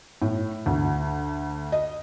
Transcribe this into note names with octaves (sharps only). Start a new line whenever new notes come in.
A2
D2
D#5